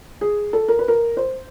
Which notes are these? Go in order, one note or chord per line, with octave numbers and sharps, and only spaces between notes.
G#4
A4
A#4
B4
A#4
C5